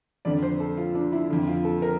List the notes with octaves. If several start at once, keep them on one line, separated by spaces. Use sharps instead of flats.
F2 D3 D5
C5
A4
F4
D4
E4
F2 D3
F4
A4
A#4